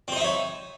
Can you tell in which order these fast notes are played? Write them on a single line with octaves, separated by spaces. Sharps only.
C4 C5 D#4 E5 C#5